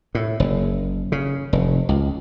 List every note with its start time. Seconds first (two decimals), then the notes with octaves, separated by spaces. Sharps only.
0.15 A2
0.40 F#1
1.12 C#3
1.53 F1
1.89 C#2